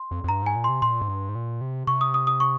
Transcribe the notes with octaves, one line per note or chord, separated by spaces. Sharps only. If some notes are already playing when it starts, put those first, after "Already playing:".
Already playing: C6
F2
F2
G2 A#5
G#2 G#5
A#2
C6
C3
A#2 C6
G#2
G2
G#2
A#2
C3
C3 C#6
D#6
D#6
D#6
C#6